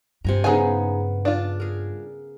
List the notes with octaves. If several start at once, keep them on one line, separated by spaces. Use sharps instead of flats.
G2 C3 G#5 A#5
C#3 B3 D#4 G#4 G#5
D4 F4
G#4 A#4